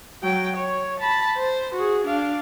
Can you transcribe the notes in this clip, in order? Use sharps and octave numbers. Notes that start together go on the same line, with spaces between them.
F#3 G5
C#5
A5 B5
C5
F#4 G#4
D4 F5